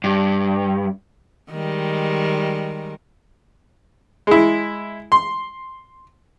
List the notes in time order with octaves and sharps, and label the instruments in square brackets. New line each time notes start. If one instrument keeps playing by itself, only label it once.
[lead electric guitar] G2
[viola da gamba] D#3 G3 G#3
[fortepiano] G#3 E4
C6